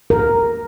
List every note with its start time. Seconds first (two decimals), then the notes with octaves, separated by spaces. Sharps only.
0.10 A#4